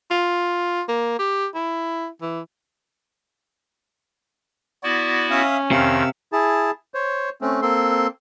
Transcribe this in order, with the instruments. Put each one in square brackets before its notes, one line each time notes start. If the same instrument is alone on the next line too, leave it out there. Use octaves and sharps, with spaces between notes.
[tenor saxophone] F4
A#3
G4
E4
E3
[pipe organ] B3 E4 F#4 [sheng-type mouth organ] D5
[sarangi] C#4 [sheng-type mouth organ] E5 F5 D#6
[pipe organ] F2 D#3 [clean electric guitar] C3 [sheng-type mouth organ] F5 E6
[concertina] E4 G#4 A5
C5 C#5
A3 C4 C#4
A#3 C4 A4 C6